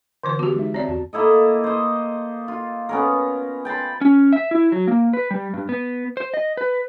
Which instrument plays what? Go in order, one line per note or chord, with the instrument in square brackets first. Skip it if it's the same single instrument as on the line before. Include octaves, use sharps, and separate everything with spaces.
[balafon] D3 E3 C5
[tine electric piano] F3 B3 [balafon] F#4 G4
[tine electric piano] G#3 D#4 E5
[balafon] C4 D5 [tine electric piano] C#5 E5
[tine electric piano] E2 F#4 A5
[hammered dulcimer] A#3 E4 A4 D#5
C5 D#5
F4
B3 C#4 A#4
G5 A5 B5 C6
[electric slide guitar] C#4
E5
E4
F#3
A#3
B4
G3
G2
B3
C5
D#5
B4